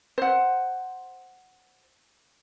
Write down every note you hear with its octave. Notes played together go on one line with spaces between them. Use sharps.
C5 F#5